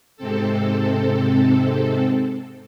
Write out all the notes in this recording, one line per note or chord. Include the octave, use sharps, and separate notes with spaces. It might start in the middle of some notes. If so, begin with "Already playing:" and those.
G#2 C3 C4 A4